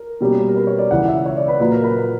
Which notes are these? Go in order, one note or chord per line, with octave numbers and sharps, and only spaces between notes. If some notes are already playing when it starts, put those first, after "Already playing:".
Already playing: A#4
B2 G3 A#3 C#4
A#4
B4
C#5
D5
C#2 C#3 E3 F#5
E5
C#5
D5
B4
A#2 F#3 A#3 B4
A#4
B4